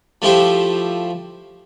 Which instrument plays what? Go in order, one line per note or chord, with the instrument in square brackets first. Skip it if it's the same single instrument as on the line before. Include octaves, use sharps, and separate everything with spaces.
[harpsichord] F3 A3 E4 G4 C5